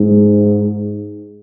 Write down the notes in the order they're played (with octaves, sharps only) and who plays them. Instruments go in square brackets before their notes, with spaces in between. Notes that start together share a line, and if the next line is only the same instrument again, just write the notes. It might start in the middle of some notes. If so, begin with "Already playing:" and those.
Already playing: [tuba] G#2